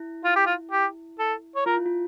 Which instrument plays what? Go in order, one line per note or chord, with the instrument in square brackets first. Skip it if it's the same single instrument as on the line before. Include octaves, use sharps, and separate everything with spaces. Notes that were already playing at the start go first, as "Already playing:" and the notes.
Already playing: [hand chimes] E4
[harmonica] F4
G4
F4
G4
A4
C#5
[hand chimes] F4 [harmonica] A#4
[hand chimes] E4
F4